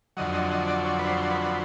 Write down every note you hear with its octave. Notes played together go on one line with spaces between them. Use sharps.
F2 D3 F#3 D#5
D#5
D#5
D5
C#5
B4
C5
B4
B4